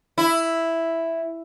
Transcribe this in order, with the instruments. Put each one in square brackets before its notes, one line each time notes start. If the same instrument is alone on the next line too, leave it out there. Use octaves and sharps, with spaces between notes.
[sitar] E4